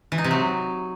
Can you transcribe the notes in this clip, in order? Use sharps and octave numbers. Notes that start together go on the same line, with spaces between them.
E3
D#4
C3
F#3